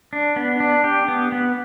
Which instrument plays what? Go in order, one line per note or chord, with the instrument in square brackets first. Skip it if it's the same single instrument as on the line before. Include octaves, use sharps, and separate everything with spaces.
[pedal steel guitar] D4
B3
D4
G4
B3
B3